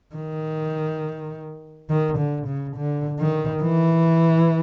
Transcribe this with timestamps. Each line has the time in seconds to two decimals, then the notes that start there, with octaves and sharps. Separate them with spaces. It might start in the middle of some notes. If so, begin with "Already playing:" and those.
0.15 D#3
1.90 D#3
2.18 D3
2.47 C#3
2.76 D3
3.19 D#3
3.62 E3